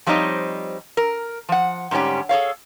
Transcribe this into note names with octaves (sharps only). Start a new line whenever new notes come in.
F3 G3 C4 D#4 C#5 D#5
A#4
F3 F#5
G#2 D3 G3 C#4 G4
G#4 A4 C#5 F5